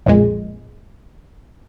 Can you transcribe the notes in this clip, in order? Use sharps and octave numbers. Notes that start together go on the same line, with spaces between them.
B1 F2 A#2 G#3